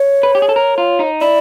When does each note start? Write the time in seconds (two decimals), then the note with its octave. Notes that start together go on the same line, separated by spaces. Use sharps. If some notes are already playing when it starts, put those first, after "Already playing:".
Already playing: C#5
0.23 B4
0.35 G4
0.42 G#4
0.49 A4
0.56 A#4
0.78 F4
0.99 D#4
1.21 E4 D5